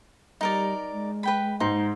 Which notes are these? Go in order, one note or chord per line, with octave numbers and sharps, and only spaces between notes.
G3 D#4 A#4 D5
G#3
B4 G5 B5
G#2 D#4 C6